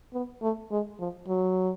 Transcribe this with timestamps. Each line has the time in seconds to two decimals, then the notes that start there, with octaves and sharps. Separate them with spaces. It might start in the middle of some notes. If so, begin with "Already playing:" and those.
0.13 B3
0.42 A3
0.71 G#3
0.99 F3
1.28 F#3